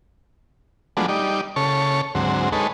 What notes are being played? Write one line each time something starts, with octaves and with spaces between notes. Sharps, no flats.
F3 F#3 G#3 A3 B3 D4
G3 D#4 D5
C#3 A4 C#5 C#6
D2 G#2 F#3 C4
G#3 D#4 A4 B4 C#5